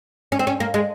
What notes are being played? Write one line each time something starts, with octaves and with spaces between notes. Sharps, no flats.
C#4
C4
C#4
A#3
G#3